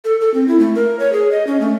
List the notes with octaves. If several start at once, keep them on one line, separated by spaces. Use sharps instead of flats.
A4
A4
C4
E4
A3
A#4
C#5
G#4
D#5
C#4
A3